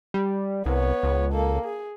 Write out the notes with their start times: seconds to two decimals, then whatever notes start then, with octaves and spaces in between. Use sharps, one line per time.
0.14 G3
0.66 C2 B3 C#5
1.03 C#2
1.33 A#3 A4
1.65 G#4